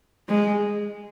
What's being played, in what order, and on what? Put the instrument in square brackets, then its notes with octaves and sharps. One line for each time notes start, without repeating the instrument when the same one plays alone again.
[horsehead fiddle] G#3